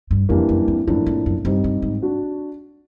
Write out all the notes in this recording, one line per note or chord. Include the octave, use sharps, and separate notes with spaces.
G2
F2 E3 G3 A#3 D4
F#2
F2
F#2 A2 F3 A#3 D4
F2
F#2
G2 G3 C4 D#4
G2
G#2
D4 F#4